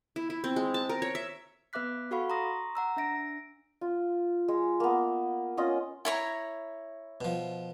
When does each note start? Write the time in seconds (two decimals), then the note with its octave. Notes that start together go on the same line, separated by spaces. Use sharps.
0.16 E4
0.30 E4
0.44 C4
0.56 G#3
0.74 A5
0.89 A#4
1.02 C#5
1.15 E5
1.73 B3 B4 E5 D6 F#6 B6
2.11 F#4 A4 F5 F#5 B5 C#6
2.30 A#5 C6 C#6 D#6 A#6
2.75 F#5 A#5 E6
2.97 D4 E5 A#6 D7
3.81 F4
4.48 G#3
4.80 A#3 B3
5.57 C#4 F4 D#5
6.05 E4 C#5 A#5
7.21 B2 F3